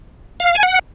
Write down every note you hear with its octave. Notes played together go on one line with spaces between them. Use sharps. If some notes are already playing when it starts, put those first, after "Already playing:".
F5
G#5
F#5